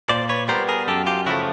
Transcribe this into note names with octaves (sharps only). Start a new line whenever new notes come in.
A#2 C5 D5
B4 C#5
G3 B3 A#4 C5
G#4 A#4
F#2 G4 A4
F4 G4
C#3 F3 A3 E4 F#4